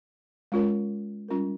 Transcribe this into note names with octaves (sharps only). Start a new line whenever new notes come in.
G#3 C#4 F4 A#4 C#5
G3 C#4 F4 A#4